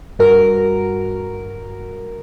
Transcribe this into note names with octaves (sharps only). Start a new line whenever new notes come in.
G2 F#4 A#4